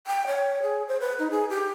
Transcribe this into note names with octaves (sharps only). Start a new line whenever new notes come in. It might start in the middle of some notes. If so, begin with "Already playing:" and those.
G5
C#5
G#4
C5
B4
D#4
G#4
G4